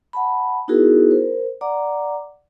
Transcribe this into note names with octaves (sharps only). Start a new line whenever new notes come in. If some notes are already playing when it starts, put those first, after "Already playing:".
F#5 A5 B5
B3 D#4 E4 F#4 G#4 A#4
A#4 C5
D5 F#5 A#5 D6